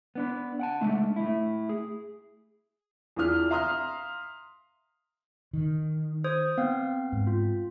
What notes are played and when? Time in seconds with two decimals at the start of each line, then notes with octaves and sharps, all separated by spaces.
0.15 B3 D4 B4
0.59 F#5 G5 A5
0.81 G#3 A3 D4
1.16 A3 E4
1.69 G#4
3.16 E2 E3 D4 F4 D#6 F6
3.50 E5 F5 A#5 C6 D#6 F6
5.53 D#3
6.24 C5 D#6 G#6
6.58 B3 C4 F5
7.12 G#2
7.27 F4